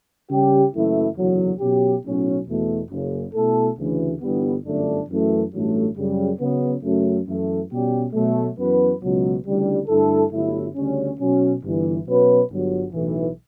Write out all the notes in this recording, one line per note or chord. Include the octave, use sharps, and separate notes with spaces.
C#3 G3 C#4 G4
F#1 F#2 E3 A3 E4
F#1 E2 D3 F#3
B2 F#3 C#4 G4
B1 A2 F#3 C#4
E2 B2 A3
F#1 F#2 C#3
B2 A3 E4 A4
D2 C#3 E3
G1 G2 E3 G3 B3
G1 F#2 D3 A3 D4
F#2 E3 A3
A1 G2 F#3 A3
F#2 C#3 G3
C#3 F#3 B3
F#2 C#3 F#3 A3
F#2 E3 A3
B2 G3 C#4 G4
B2 F#3 A3
F#2 E3 B3 F#4 B4
C#2 B2 F#3
D2 C#3 E3 G3 D4
G2 D3 A3 E4 A4
G1 G2 F#3 A3 E4
D2 C#3 G3 C#4
B2 F#3 C#4
G1 G2 E3
B2 F#3 C#4 F#4 B4
G1 G2 F#3
B1 A2 E3